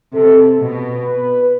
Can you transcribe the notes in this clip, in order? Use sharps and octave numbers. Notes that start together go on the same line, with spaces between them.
C3 A4
B2
B4